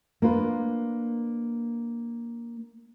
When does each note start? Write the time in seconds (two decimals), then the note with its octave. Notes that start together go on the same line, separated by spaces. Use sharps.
0.22 A#3 D4 F4 B4